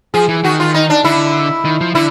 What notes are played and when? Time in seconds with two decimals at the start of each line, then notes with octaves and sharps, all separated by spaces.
0.14 F3 G#4
0.29 E3
0.44 D#3 F#4
0.60 F4
0.74 D#4
0.90 D4
1.04 D3 E4
1.65 D#3
1.81 F3
1.95 D3 E4